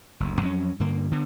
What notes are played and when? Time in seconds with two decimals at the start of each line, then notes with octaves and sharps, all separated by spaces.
0.20 F#1 D2
0.41 F2 F#3 C#4
0.80 G2 D3 A#3
1.11 D3 B3